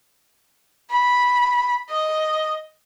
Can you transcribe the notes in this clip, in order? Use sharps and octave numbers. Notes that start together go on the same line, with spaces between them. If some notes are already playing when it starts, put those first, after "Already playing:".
B5
D#5